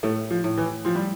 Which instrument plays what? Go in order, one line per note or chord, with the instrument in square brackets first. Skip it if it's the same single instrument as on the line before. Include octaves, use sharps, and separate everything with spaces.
[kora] A2 [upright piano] A3
[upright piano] F3
[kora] A2
[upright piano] E3
[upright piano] F3 [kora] C4
[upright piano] G3